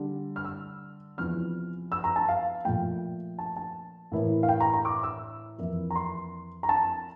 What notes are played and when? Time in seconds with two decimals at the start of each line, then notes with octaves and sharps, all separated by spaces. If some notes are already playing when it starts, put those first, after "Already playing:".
Already playing: D3 G3 D4
0.36 F6
0.45 E6
1.18 E2 C3 F3 C4 E4 F6
1.92 E6
2.04 A#5
2.16 A5
2.28 F5
2.65 A#2 F3 A3 G5
3.38 A5
3.56 A5
4.12 A2 E3 A#3 E4
4.43 F5
4.49 G5
4.60 A#5
4.74 A#5
4.85 D6
5.03 E6
5.58 F2 E3 A#3 E4
5.90 A#5
5.95 C6
6.63 A#5
6.69 A5